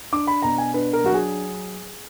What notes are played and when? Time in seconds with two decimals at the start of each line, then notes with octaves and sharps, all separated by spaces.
0.12 D4 D6
0.27 B5
0.42 B2 A#5
0.58 G#5
0.74 D4 B4
0.93 A#4
1.04 F#3 F#4
1.14 G#4